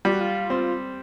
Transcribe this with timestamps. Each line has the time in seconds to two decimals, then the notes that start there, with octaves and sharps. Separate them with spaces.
0.05 G3 F4
0.13 F#4
0.20 F4
0.50 C4